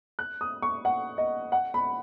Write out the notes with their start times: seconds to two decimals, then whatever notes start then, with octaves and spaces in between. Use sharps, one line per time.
0.19 F#6
0.41 D#6
0.62 C#6
0.85 F#5
1.18 D#5
1.52 F#5
1.74 B5